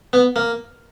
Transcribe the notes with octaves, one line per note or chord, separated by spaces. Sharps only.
B3
A#3